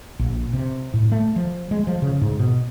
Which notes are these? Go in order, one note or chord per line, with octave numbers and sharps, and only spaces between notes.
A#1
C3
A2
A3
F3
G#3
F3
C#3
G#2
B2